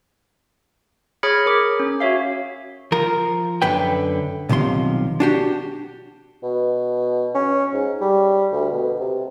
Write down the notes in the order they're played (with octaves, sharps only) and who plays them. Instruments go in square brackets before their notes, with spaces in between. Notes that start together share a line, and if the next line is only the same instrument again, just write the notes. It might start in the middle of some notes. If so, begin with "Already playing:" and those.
[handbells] G#4 C#5 B5 F6 G#6 C#7
A#4 D6
C#4
F#4 C#5 E5 F5
[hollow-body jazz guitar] F3 A#4
F#2 D3 B4 G5
B1 C3 D#3 F3 C6
D4 F#4 G4
[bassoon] B2
C#4
G#2
G3
D2
B2
C3